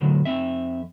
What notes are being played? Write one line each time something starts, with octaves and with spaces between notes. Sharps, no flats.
F#2 A2 D3 F#3
F2 C4 E5